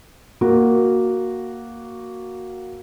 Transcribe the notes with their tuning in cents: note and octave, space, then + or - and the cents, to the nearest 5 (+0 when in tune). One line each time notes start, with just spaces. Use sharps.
A#3 +0 F#4 +0